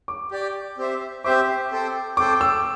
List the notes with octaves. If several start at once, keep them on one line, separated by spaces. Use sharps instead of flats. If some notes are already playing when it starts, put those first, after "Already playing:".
D6
G4 D5 G5
C4 G4 C5 E5
C4 G4 C5 E5 D6
C4 A4 C5 G5
C4 A4 C5 G5 D6
E6